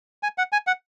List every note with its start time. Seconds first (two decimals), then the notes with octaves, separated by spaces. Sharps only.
0.23 G#5
0.38 F#5
0.52 G#5
0.67 F#5